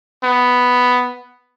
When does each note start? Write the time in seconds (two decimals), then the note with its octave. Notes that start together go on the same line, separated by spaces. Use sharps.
0.23 B3